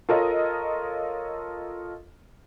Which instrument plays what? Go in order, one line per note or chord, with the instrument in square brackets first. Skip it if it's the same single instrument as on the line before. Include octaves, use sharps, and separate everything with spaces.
[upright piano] F4 A4 A#4 C#5 D#5